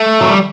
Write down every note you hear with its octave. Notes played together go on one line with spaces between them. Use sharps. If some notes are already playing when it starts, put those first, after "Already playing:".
Already playing: A3
F#3
G3